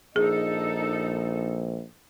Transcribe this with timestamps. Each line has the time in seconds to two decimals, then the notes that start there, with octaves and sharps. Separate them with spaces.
0.16 A#1 D#4 G#4 A4